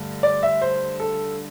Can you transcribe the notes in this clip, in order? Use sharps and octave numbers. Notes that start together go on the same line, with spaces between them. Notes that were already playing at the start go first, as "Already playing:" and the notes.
Already playing: G2 D3 A3
D5
E5
C5
A4